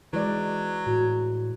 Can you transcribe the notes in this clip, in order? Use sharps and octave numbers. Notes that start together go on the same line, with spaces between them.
E3 F#3 G#3 D5
A2 F#4